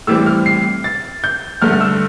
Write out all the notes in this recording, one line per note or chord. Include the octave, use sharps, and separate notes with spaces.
A2 E3 G3 C4 E6
F6
C7
A6
G6
G2 D3 A3 F6
F6
E6